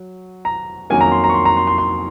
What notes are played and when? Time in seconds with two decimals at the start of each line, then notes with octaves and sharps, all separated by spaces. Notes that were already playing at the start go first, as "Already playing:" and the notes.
Already playing: F#3
0.45 A#5
0.90 F2 D#3 F#3 A#3 C#4 G#5
1.01 A#5
1.12 C6
1.24 A#5
1.30 C#6
1.34 C6
1.45 A#5
1.57 C6
1.67 C6
1.78 C6